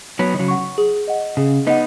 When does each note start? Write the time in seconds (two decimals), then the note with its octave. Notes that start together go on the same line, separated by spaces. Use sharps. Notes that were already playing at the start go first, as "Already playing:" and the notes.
0.19 F#3 B3 C#5
0.34 D#3
0.39 C#3 F#3
0.48 F#5 C#6
0.78 G#4
1.08 D#5 F#5
1.37 C#3 G#4
1.67 B3 D#4 D#5 F#5